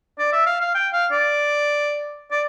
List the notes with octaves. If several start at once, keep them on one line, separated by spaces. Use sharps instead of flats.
D5
E5
F5
F5
G5
F5
D5
D5